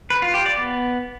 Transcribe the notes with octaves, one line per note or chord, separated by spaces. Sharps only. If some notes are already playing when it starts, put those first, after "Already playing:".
B4
F4
G4
D5
B3